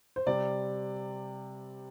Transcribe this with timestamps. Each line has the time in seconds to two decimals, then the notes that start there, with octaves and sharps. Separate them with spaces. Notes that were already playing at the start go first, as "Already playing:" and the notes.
0.16 C5
0.26 C3 G3 C4 D5